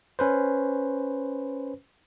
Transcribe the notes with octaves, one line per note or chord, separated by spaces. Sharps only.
C#4 B4 C5